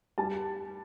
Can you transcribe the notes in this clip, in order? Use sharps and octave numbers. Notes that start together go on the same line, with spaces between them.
G3 A5